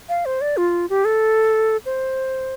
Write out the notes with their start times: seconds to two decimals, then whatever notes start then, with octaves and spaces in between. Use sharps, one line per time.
0.09 F5
0.26 C5
0.41 D5
0.57 F4
0.90 G4
1.05 A4
1.86 C5